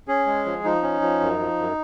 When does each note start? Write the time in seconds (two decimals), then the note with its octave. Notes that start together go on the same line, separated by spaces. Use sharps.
0.08 C#4 G#4
0.26 G#3
0.45 F3
0.64 F3 D#4
0.83 C#4
1.01 F3
1.20 F#2
1.39 F3
1.59 F#2